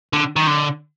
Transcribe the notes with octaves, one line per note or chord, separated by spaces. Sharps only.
D3
D#3
D3